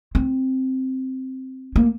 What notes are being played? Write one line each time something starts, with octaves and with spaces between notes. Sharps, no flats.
C4
A#3